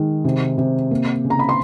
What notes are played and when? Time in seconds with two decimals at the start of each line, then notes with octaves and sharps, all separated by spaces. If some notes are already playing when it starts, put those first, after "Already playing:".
Already playing: D#3 G#3
0.24 C3
0.58 C3
0.91 A#3
1.24 C#3
1.30 A#5
1.39 B5
1.49 C6